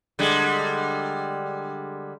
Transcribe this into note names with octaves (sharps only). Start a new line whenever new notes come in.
D3 G3 G#3